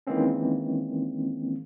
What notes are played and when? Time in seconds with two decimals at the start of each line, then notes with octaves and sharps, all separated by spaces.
0.07 D#3 E3 G#3 A#3 C4 C#4